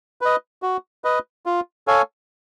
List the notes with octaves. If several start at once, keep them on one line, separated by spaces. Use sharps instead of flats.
B4 D#5
F#4
B4 D#5
F4
A4 C#5 F5 G#5